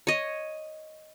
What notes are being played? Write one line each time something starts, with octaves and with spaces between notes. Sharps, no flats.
C#5 D#5